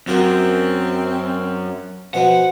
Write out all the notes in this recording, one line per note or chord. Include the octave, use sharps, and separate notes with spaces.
F#2 C4 F4 F#4 A#4
B2 F3 B3 F#5